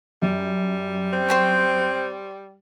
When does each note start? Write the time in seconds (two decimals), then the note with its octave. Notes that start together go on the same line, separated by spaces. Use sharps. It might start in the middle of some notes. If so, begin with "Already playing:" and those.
0.22 F#2 G3
1.13 C4
1.29 C5 G5 C#6